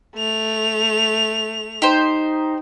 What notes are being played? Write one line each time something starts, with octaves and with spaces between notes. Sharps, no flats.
A3 F7
D#4 G4 C5